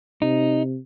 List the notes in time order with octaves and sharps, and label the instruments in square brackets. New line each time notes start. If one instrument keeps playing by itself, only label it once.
[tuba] C3 [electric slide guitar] D#4